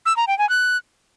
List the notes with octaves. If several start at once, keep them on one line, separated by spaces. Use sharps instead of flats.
E6
A#5
G5
G#5
F#6